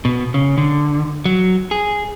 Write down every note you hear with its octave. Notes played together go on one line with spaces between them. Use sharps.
B2
C#3
D3
F#3
G#4